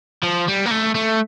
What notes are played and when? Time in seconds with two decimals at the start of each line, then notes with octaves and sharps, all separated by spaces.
0.23 F3
0.48 G3
0.66 A#3
0.71 A3
0.95 A3